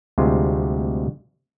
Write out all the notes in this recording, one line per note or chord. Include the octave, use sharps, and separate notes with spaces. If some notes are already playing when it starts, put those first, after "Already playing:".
D2 C3 G3 G#3 F4